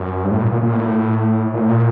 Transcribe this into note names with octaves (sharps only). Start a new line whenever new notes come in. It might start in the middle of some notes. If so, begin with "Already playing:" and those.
Already playing: F#2
G2
A2
A#2
A#2
A#2
A2
A#2
A2
A#2